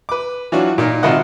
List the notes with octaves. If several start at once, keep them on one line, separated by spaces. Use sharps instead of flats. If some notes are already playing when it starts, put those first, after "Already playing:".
B4 D6
E3 F#3 D4 F4 F#4
A#2 D#4 F4 A#4
G#1 C3 F4 A#4 D#5 F#5